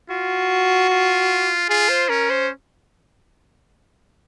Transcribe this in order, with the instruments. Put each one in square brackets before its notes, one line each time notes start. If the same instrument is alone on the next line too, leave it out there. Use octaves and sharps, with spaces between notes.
[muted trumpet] F4 [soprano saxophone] F#4
[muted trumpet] F4
[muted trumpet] F4 [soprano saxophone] G#4
[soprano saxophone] C5
[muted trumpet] C#4 [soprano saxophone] A#4
[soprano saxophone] C5